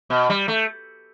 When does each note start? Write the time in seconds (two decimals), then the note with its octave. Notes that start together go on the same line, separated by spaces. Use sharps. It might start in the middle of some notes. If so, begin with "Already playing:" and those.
0.10 B2
0.29 G3
0.48 A3